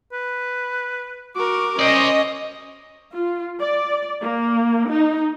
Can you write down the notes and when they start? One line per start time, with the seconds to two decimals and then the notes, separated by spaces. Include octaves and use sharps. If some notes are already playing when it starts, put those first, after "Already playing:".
0.12 B4
1.36 F#4 A#4 D6
1.79 C#4 C5 D5 D#5
3.12 F4
3.59 D5
4.23 A#3
4.89 D#4